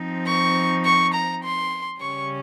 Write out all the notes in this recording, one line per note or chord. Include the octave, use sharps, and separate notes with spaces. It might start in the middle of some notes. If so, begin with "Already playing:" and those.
Already playing: F3 C4 D#4
C#6
C#6
A#5
C6
C#3 G3 C#4 C#6